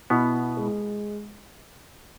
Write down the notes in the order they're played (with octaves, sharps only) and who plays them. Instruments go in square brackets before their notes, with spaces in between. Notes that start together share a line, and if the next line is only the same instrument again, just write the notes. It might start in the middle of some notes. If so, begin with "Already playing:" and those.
[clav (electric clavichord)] B2 B3 [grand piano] E4
[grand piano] G#3